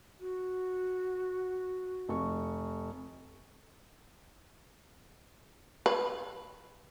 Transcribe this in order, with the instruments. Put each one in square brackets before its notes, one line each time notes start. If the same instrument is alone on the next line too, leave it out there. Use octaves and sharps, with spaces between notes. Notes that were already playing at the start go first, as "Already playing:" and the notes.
[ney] F#4
[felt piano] F1 C#6
[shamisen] B4